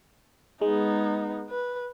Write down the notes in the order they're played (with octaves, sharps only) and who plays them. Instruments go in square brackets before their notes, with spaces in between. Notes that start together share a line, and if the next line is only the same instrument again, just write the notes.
[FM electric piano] G#3 [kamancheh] B3 D#4
[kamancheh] B4